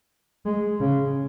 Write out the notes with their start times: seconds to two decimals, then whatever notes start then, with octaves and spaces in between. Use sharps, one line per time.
0.46 G#3
0.81 C#3